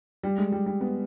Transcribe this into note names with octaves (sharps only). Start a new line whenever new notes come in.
G3
G#3
G3
G3
B3